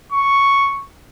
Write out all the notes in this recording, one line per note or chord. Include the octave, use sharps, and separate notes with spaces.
C#6